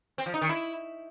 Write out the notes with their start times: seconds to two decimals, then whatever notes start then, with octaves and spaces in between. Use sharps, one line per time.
0.18 C4
0.26 F3
0.34 D#4
0.41 D#3
0.49 E4